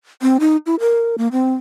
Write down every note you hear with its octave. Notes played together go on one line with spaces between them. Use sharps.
C4
D#4
E4
A#4
A#3
C4